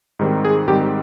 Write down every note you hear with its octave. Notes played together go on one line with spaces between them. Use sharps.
G#2 D#3 G3 C4
G#4
G#2 D#3 G3 C4 G4